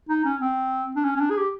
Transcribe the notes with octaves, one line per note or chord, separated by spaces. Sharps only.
D#4
C#4
C4
D4
C#4
C#4
D4
G#4
G4